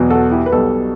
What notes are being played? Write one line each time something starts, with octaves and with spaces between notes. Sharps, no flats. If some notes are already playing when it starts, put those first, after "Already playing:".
Already playing: E2 B2 F#3
F#4 A4
E4 G4
B4
B1 B2 G3 F#4 A4